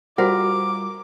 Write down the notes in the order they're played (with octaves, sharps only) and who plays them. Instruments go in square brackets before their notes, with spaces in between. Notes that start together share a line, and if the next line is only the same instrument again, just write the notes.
[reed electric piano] G3 F4 [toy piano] F#4 C5 F#5 [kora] A#4 [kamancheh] D6